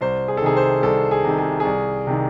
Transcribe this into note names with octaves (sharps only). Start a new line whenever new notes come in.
C2 C5
G#4
A4
C3 D#3 G#4
C5
C2 A4
G#4
C3 D#3
G#4
C2 G#4
C3 D#3